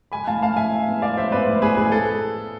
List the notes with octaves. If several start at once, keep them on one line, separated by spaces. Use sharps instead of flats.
G#3 G#5 B5
A2 F5 A5
A2 F5 A5
A2 E5 G#5
A2
B3
G#3 D5 F5
G#3 C5 E5
B3 B4 D5
A2
B3 G#4 B4
A2 G#4 B4
A4